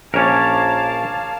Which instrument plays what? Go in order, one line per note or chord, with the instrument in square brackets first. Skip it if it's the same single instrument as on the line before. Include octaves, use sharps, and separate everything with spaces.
[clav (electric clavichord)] A#1 C#4 [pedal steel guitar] A#4 C#5 D5 [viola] F5 A5